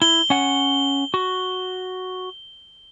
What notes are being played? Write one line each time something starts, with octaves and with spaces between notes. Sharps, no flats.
E4 G7
C#4 F#5
F#4